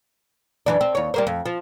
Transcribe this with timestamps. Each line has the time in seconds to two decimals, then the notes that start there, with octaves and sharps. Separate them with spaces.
0.66 F#2 E3 D4
0.81 C4
0.95 D#2 C#5
1.14 G3 A#3 C5
1.27 F2
1.46 F3